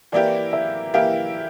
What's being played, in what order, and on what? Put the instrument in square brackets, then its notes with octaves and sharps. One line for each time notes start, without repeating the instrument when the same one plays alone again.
[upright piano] E3 A#3 E4 G4 [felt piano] D5
[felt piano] E5
[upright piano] E3 A#3 E4 G4 [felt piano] F5